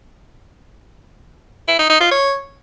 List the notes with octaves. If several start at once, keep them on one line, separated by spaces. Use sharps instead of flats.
E4
D#4
D#4
F4
C#5